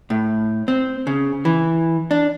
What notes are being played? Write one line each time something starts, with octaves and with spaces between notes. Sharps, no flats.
A2
C4
C#3
E3
D4